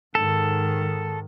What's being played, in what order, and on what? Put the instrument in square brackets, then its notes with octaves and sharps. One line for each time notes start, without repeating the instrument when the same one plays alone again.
[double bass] G#2 D#3 [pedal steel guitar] A4